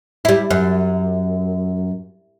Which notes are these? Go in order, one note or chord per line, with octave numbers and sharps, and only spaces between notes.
G3 E4
F#2